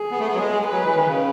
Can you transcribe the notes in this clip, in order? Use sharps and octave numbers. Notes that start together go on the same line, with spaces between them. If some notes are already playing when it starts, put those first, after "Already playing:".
Already playing: G#4
B3
A3
B3
F#3
G#3
F#3 B4
E3
D#3
C#3